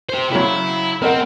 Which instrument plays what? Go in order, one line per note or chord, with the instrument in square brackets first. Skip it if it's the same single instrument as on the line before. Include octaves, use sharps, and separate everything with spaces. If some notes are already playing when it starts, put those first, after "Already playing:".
[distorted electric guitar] G4 C5
[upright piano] C#3 F#3 [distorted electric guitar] E4
[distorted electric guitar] C4 [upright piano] A#4 D#5 F#5